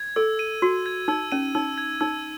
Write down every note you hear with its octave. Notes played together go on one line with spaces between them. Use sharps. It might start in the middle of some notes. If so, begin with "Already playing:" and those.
Already playing: G#6
A4 E6
D#7
F#4 E6
G#6
D#4 E6
C#4 D#7
D#4 E6
G#6
D#4 E6